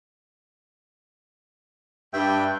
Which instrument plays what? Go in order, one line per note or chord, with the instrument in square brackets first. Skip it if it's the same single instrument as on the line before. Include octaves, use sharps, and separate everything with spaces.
[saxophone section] G2 [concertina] E5 G5